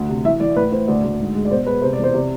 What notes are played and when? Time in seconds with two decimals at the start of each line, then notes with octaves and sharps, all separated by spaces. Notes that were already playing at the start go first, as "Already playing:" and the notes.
Already playing: D2
0.09 C3
0.25 E3 E5
0.40 E3 D5
0.56 A2 B4
0.72 A2 C5
0.88 D2 D5
1.04 D2
1.19 G#2
1.35 G#3
1.45 D5
1.51 B2 C5
1.66 G#3 B4
1.82 C3 C5
1.93 D5
1.99 E2 C5
2.14 C3 D5